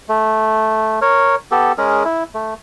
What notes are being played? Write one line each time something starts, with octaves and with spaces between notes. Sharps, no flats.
A3
A#4 C#5
B3 G4 A4
G#3 C#4 G#4 A#4
E4
A3